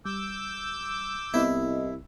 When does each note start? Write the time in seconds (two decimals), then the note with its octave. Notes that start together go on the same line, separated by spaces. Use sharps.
0.05 G3 D6 E6 G6
1.34 C2 B3 C4 E4 D#5